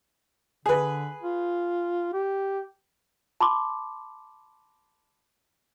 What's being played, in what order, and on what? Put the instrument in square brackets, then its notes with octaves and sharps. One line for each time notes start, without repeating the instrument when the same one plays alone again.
[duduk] D3 [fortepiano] G#4 B4
[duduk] F4
G4
[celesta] A5 B5 C6 D6